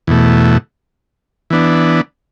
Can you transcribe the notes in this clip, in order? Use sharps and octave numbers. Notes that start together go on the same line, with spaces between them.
E2 B2 A3
E3 B3 D4